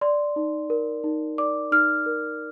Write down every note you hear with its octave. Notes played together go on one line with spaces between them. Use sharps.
D5 C6
D#4
A#4
D#4
D5 D6
D#4 F6
A#4